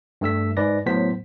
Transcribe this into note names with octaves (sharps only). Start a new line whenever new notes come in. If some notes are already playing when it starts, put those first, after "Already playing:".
G2 A3 E6 B6
G#2 B4 D5 A#6
A2 F#3 B3 C5 B6